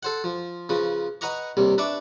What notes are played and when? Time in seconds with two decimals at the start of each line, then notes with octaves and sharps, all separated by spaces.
0.03 A4 C5 F#5
0.24 F3
0.69 C#3 F3 B4
1.21 B4 D#5 F#5 A#5 C#6
1.57 D#2 C3 G3
1.78 D4 B4 E5 C#6 D6